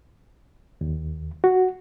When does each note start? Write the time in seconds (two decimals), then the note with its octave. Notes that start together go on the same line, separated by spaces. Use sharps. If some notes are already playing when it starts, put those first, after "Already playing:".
0.81 D#2
1.44 F#4